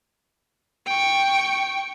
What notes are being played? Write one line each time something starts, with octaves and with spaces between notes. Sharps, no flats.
G5 C#6